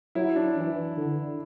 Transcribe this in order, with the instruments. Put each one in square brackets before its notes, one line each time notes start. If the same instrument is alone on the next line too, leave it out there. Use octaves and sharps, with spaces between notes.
[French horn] F#3 [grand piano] E4
[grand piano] D4
[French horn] E3
D3